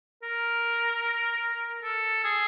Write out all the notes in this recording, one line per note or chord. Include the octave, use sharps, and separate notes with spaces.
A#4
A4
G#4